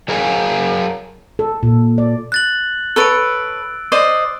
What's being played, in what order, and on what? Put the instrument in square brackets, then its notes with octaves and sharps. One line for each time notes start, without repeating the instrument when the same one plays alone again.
[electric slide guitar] F#3 G#4 A#4 F5 G#5
[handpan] A4
A#2
D5
[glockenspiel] F#6 A6 F#7
[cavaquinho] A4 B4 C#5 [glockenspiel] E6 D7
[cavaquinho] C5 D5 D#5